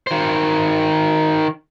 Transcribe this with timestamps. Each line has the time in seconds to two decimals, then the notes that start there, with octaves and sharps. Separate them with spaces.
0.07 D#3 C5